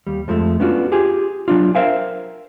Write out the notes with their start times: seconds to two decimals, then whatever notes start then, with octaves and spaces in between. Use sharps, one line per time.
0.07 D#2 G3
0.28 F2 F3 G#3 A3
0.60 B3 C#4 D4 F4 F#4
0.92 F4 G4 G#4 G#5
1.48 F#3 A3 D4 F4
1.75 A#4 C5 E5 F5 G5 G#5